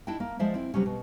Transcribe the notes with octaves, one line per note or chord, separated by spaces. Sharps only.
D4 E4 D#5 G5
A#3
F3 G#3 C5 D5 E5
C4 E4
C3 F#3 G3 C#4
B2